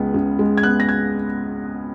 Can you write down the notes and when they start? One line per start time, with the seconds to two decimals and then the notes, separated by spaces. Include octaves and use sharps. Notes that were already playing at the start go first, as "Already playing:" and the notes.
Already playing: C#2 C#3 G#3 B3
0.14 C#3
0.39 G#3
0.58 G#6
0.63 B3 F#6
0.80 A#6
0.89 G#6